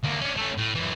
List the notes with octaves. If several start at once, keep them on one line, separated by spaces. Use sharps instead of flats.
D2 A#3
C#4 D4
A3 C#4
A2
F#2 E3